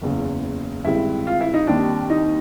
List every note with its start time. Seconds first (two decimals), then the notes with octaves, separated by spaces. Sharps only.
0.01 F#1 E2 C#3
0.84 G2 D#3 G#3 C4 E4
1.27 F4
1.41 E4
1.54 D#4
1.67 D#2 D#3 G3 C4 D4
2.10 D#4